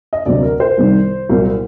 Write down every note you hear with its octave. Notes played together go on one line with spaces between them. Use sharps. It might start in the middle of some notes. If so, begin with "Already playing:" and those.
D#5
D2 C3 F#3 D5
A#4
C5
C2 C3 D#3 G3
C2 A#2 F#3